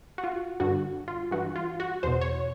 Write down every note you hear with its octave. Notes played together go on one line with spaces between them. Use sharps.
F#4
F4
G2 D3 F#4
F4
G2 E3 F#4
F4
F#4
E2 B2 C5
C#5